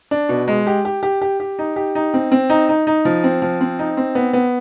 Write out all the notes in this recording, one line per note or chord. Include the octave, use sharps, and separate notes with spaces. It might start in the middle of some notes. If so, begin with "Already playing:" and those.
D4
B2
G#3
G4
G4
G4
G4
G4
D#4
G4
D#4
C4
C4
D#4
D#4
D#4
F3
C4
F3
C4
D#4
C4
B3
B3